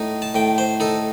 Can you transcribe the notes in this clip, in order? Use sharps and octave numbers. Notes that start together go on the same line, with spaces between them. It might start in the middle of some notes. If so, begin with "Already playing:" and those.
Already playing: A2 D#4
A5
A2 G5
C5
D#4 A4